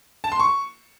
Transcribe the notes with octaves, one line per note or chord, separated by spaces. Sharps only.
A5
C6
C#6